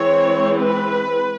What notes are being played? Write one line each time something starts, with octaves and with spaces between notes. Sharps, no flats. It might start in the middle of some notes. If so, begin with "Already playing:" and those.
Already playing: E3 G#3 C4 C#5
B4